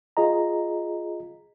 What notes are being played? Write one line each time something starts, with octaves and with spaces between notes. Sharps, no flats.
F4 G#4 D#5 A#5